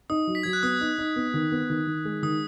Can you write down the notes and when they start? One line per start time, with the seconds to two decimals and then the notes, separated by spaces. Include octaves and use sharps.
0.10 D#4 D#6
0.27 F#3
0.35 B6
0.43 F#3 G#6
0.53 F#6
0.63 B3 D#6
0.81 D#4
0.98 D#4
1.16 B3
1.34 D#3
1.52 B3
1.70 D#3
1.87 D#3
2.05 G#3
2.23 D#3 D#6